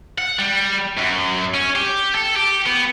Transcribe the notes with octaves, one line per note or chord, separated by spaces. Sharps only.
F#5
G3
F#2
C#4
G4
A4
G4
B3